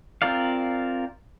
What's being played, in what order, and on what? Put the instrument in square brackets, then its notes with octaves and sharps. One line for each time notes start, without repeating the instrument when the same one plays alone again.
[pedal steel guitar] C4 F4 A#4 D5 F5